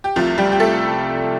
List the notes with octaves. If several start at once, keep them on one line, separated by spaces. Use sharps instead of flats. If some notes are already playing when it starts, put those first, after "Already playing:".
G4
C2 C3 F3 A3 F4
G3 G4
G4
A3 A4